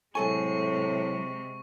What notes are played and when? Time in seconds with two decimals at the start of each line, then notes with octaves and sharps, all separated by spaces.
0.15 A2 C3 F#3 G#3 A4 G#5 C#6